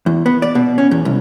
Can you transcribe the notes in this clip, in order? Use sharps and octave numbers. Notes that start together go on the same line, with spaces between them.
E2
B3
D5
B2
C#4
E2
C2